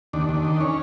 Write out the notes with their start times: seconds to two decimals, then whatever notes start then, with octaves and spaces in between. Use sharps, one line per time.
0.13 D#2 D4
0.29 D#2
0.45 D#3
0.61 C#4